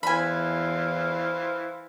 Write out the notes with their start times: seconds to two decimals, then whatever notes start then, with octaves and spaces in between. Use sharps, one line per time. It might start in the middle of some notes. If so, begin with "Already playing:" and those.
0.03 E2 E3 C5 F5 G#5 B5